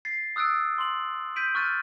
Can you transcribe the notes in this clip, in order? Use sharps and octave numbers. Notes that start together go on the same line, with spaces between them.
A6 C7
D#6 E6 F#6 A6 D7
C6 F#7
G6 B6 D7 D#7 F#7
C#6 F6 F#6 A6 D#7